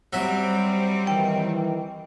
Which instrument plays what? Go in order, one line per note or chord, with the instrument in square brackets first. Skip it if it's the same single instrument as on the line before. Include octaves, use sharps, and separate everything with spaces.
[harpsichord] F#3 E5 [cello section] G3 C4
[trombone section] D#3 E3 [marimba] G5